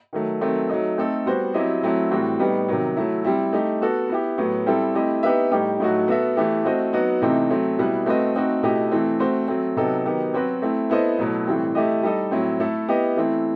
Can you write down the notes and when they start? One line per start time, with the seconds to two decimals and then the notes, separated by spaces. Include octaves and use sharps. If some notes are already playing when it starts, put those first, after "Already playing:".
0.13 D#3 F#3 A3
0.41 D#3 F#3 A3 C4
0.69 F#3 A3 D#4
0.98 A3 C4 D#4 A4
1.26 G3 B3 F#4 C5
1.54 F#3 C4 E4 G4 D#5
1.83 F#3 A3 C4 E4
2.11 A2 E3 G3 C4 F#4
2.39 A2 G3 B3 D#4
2.68 C3 D#3 F#3
2.97 F#3 A3 E4
3.24 G3 C4 E4
3.53 A3 D#4 G4
3.81 B3 F#4 A4
4.09 B3 E4 G4
4.38 A2 F#3 B3
4.66 G3 C4 E4 A4
4.94 A3 C4 E4 G4 D#5
5.23 B3 D#4 G4 B4 E5
5.51 A2 G3 D#4 G4
5.80 A2 F#3 A3 D#4 F#4
6.08 B3 F#4 A4 E5
6.37 E3 A3 E4 G4
6.64 A3 C4 F#4 C5 D#5
6.93 F#3 B3 D#4 F#4
7.22 C3 E3 A3 C4 D#4
7.50 F#3 A3 C4
7.78 B2 G3 B3 E4 B4
8.06 A3 C4 F#4 B4 D#5
8.35 A3 C4 D#4 F#4
8.63 B2 A3 E4 G4 D#5
8.91 E3 A3 C4
9.20 A3 C4 F#4 C5
9.48 F#3 A3 C4
9.77 C3 F#3 B3 D#4 A4
10.05 D#3 F#3 B3 D#4 G4
10.33 F#3 C4 F#4 B4
10.62 A3 C4 E4
10.90 B3 E4 A4 C5 D#5
11.18 B2 F#3 A3 E4
11.47 A2 E3 G3 C4
11.75 A3 E4 G4 D#5
12.03 G3 D#4 A4 D#5
12.31 A2 F#3 C4 E4
12.60 A3 E4 A4
12.89 B3 E4 G4 D#5
13.17 E3 A3 C4 E4